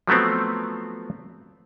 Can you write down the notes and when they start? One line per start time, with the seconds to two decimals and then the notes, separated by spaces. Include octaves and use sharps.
0.07 F3 F#3 A3 B3 C4